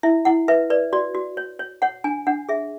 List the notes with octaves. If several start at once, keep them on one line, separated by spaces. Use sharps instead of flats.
E4 E5
E4 F#5
B4 E5
B4 D5
F#4 D5
F#4
C#5
C#5
C#5 F#5
D4 G#5
D4 F#5
G#4 E5